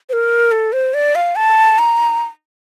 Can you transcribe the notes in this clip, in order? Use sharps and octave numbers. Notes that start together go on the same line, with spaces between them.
C5
A#4
A4
C5
D5
F5
A5
A#5